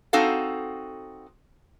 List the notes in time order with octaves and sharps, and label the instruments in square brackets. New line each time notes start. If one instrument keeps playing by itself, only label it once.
[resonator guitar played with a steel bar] C4 D#4 F#4 A4 F5